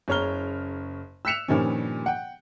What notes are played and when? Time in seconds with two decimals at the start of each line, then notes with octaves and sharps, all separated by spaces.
0.08 F#1 C#3 C#5 A#5 F6 G7
1.25 E6 F#6 B6 C#7 E7 F7
1.48 G2 A#2 D#3 F3 G3 C#4
2.06 F#5 G5